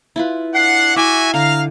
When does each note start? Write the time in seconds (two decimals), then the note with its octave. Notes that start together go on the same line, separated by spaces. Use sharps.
0.16 E4 F4 B4
0.55 D4 F#5 C7
0.96 E4 F#4 E5 G#5 D6
1.34 D3 F5 A#5